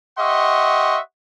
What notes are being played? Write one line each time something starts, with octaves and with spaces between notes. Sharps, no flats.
G4 D#5 E5 F#5 C6 C#6